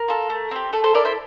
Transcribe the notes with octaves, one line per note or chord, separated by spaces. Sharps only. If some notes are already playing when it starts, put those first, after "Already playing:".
Already playing: A#4
F4 A4
A3
C4 G4
A3 A4
A4 C5
E4 A4 A#4 D5
C5 E5